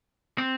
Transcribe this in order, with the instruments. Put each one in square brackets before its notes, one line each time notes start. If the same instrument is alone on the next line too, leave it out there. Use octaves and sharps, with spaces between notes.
[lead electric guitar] C4